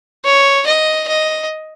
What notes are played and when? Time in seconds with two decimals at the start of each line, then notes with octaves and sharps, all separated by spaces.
0.25 C#5
0.66 D#5
1.08 D#5